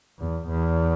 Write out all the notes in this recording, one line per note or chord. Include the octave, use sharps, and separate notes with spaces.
E2
E2